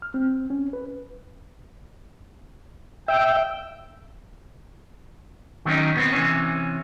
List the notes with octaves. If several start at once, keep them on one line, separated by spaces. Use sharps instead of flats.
F6
C4
C#4
B4
E5 G5
D#3 F#3 A3 B3 C#4 D#4
B2 B3 C4
C3 E3 C#4